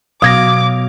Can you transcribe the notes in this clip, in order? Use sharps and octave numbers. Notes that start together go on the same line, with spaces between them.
B2 F#3 F5 D6 D#6 G#6 A#6